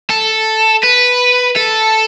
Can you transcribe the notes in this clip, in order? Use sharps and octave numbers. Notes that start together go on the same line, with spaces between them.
A4
B4
A4